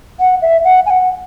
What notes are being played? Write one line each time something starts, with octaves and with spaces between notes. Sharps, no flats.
F#5
E5
F#5
G#5
F#5